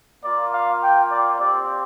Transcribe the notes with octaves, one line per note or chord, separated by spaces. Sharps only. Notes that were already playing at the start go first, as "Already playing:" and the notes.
A#3 F4 D5
F5
G5
D5
C4 G4 D5